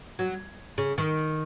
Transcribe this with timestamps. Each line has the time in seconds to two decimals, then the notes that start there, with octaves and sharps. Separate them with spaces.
0.19 F#3
0.78 C#3
0.98 D#3